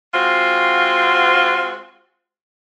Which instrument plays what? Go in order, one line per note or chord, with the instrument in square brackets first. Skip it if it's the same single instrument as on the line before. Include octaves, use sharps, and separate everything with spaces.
[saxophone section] G#3 C4 F4 F#4